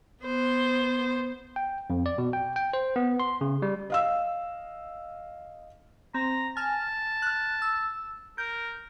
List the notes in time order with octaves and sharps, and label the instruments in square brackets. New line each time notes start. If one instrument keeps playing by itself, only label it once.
[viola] B3 C5
[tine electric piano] G5
F2
D5
B2
G5
G5
C5
B3
C6
C#3
G3
[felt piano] D#5 F5 E6
[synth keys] C4 [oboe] A#5
[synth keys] G#5 F6 [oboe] A5
[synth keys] F6 F#6
E6
[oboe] A#4 [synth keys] G6